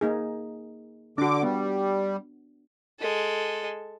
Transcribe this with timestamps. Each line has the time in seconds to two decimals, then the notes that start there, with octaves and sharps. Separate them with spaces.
0.01 A#3 D#4 G#4
1.18 D3 D4 F#4 D6
1.43 G3 B3
3.00 G#3 A4